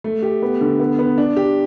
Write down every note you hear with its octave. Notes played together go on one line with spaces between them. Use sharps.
A3
G4
B3
D3
B3
B3
D4
G4